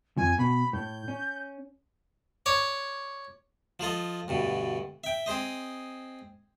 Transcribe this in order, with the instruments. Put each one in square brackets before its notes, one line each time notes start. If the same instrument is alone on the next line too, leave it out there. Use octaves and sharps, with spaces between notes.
[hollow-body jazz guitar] F2 F3 [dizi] G#5
[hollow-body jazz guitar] B2 [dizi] B5
[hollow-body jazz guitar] A2 [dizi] G6
[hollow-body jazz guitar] C#4
[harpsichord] C#5 D5
F3 F4 A4 D#5
D2 G2 B2
E5 G5
C4 G#4 C5 D#5